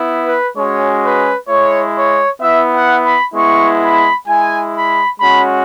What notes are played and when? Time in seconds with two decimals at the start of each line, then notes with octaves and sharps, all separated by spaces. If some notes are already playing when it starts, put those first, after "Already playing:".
Already playing: B3 E4
0.24 B4
0.55 G#3 C#4 F#4 C#5
1.03 B4
1.48 G#3 E4 C#5
1.95 C#5
2.41 B3 E4 E5
2.72 F#5
3.03 B5
3.34 G#3 B3 E4 C#6
3.81 B5
4.28 G#3 E4 G#5
4.74 B5
5.19 G#3 C#4 F#4 B5